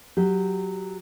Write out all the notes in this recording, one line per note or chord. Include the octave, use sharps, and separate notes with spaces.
F#3 G4